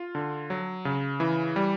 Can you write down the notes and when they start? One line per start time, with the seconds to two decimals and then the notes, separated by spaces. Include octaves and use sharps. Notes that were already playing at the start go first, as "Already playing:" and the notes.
Already playing: F4
0.15 D3
0.50 F#3
0.85 C#3
1.20 E3
1.56 G3